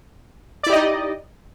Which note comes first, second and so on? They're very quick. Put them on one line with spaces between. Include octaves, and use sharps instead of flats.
D5 E4 G4 D#5 D#4